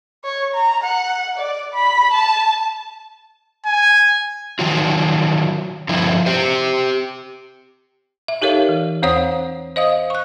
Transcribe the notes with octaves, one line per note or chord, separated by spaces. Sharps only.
C#5
A#5
F#5
D5
B5
A5
G#5
D#3 F#3 F4
G2 D3 F3 E4
G4 C5
E5
D#4 G4 A4 A#4 C#5 F5
E3
E2 C4 C5 C#5 F#5 D#6
C5 D#5 F5 D#6
C#6 F#6